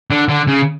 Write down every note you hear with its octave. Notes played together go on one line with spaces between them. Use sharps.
D3
D3
C#3